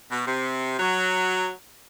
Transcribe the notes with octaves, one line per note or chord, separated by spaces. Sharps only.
B2
C3
F#3